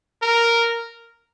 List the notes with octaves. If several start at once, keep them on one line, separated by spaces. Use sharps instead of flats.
A#4